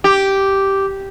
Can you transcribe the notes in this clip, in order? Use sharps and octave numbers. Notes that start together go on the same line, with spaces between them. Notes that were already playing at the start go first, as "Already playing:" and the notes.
G4